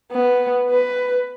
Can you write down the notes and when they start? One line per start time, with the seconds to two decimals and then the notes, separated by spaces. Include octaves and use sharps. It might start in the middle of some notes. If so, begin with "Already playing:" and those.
0.12 B3
0.71 B4